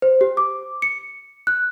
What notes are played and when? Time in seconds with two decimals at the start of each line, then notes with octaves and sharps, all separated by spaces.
0.02 C5
0.21 G4
0.37 D6
0.82 C#7
1.47 F#6